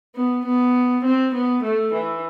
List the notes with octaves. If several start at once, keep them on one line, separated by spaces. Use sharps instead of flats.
B3
B3
C4
B3
A3
E3